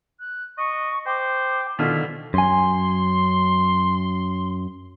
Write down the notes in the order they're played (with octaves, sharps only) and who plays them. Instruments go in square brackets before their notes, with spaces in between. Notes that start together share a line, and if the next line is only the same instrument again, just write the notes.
[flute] F#6
[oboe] D#5 [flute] C#6
[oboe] C5 [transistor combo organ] G5 [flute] D6
[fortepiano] B2 D3 F4 [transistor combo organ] D#3 F6 [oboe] E4
[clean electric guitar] F#2 G#5 [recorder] C6